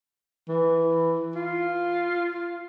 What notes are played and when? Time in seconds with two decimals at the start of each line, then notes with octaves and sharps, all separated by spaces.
0.49 E3
1.35 F4